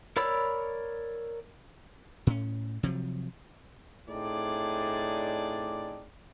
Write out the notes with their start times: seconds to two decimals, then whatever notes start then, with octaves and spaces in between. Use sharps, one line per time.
0.17 A#4 C#5 D5 B5 E6
2.27 A2 C#4
2.83 C3 F3 F#3
4.09 A2 C4 D4 D#4 G#4 D5